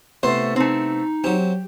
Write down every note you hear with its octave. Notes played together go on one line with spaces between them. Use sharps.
C3 A3 B3 E4 C5
A3 C4 D#4
F#3 C4 G4